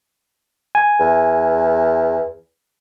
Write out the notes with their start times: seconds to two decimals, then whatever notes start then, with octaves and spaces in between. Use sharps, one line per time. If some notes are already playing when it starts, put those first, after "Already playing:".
0.75 G#5
1.00 E2